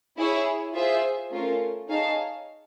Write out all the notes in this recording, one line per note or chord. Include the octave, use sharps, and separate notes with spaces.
E4 G#4 C#5
F4 G#4 C5 E5
A3 C#4 F4 A#4
D#4 G#4 C#5 F5 A5